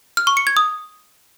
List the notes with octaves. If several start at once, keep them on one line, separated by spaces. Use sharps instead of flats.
F6
C#6
C#7
G#6
D#6